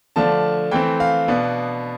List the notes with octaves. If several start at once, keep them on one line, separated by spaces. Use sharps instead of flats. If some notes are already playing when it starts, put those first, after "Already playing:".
D3 F3 A3 D4 A5
E3 A3 C4 G5
F5
B2 B3 D4